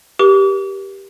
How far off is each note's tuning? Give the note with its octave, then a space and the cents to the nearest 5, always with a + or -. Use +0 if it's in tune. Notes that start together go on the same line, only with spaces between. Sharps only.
G4 +0 A#4 +40 D6 -40